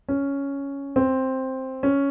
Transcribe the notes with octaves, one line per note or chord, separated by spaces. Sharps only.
C#4
C4
C#4